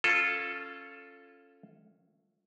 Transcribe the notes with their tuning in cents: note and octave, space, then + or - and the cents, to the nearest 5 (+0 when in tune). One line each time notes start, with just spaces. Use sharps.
C#4 -10 F4 +0 A4 +0